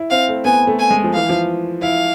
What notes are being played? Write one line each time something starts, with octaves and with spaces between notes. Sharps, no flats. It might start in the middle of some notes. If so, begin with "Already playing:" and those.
Already playing: E4
C4 F5
A3
B3 G#5
A3
G#5
G#3
F3
E3 F5
F3
E4 F5